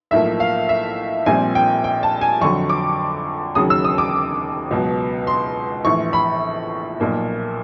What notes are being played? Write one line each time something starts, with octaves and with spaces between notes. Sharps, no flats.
B1 A2 F3 A#3 E5
F5
E5
A#1 A#2 G3 C4 G#5
G5
G5
A5
G#5
F2 D3 F#3 C#6
D6
E1 D#2 C#3 F#3 D#6
E6
D#6
D6
C#2 B2 F#3
C6
A#1 A2 E3 C#6
B5
B1 A#2 F3 A#3